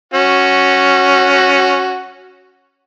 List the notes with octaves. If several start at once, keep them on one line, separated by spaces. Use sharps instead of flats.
C#4 F#4